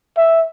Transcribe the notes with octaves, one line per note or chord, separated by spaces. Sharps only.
E5